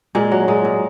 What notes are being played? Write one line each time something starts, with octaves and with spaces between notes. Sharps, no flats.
A#2 G#3
F#3
A#2 G#3
A#2